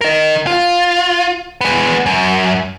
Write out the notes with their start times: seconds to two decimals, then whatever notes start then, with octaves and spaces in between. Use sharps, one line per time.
0.01 A#4 D#5
0.47 F4
1.61 G#3 B3
2.06 F#2